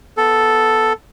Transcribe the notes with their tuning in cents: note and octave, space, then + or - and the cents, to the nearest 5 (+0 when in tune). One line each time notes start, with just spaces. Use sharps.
B3 +0 A4 +0